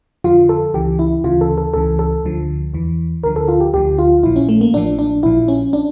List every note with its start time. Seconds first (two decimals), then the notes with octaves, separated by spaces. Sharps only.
0.24 F2 D3 F3 F4
0.49 A4
0.74 C#2 C#3 E3 G4
0.99 E4
1.24 D2 C#3 E3 F4
1.41 A4
1.58 A4
1.74 C#2 C#3 E3 A4
1.99 A4
2.24 D2 D3 F3
2.73 E2 E3
3.23 D2 D3 F3 A#4
3.36 A4
3.48 F4
3.61 G4
3.74 D2 D3 F3 G4
3.99 F4
4.23 A#1 A#2 F3 E4
4.36 C#4
4.49 A3
4.61 A#3
4.74 A1 A2 F3 D4
4.99 D4
5.23 A#1 A#2 F3 E4
5.48 C#4
5.73 D4